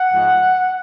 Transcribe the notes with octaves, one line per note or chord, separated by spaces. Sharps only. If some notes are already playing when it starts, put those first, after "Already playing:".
Already playing: F#5
G#2 F3 G#3